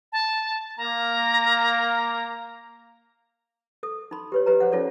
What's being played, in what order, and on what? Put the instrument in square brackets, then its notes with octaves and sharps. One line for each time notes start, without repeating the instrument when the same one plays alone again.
[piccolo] A5
[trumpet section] A#3 [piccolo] A#5
[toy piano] A4 D#6
D#4 B5 C6
G4 B4 C#5
G4 B4 D#5 A#5
G#4 C5 C#5 F5 F#5
C#4 D#4 F4 A4 C#5 D5